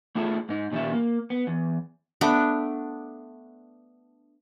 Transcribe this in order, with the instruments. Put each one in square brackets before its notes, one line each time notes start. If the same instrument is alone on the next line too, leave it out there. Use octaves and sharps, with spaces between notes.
[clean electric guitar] A3 E4 F4 G#4 A4
G#2 D#4
A#2 D#3 G3 C#4 E5
A#3
B3
E2
[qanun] A3 B3 D4 D6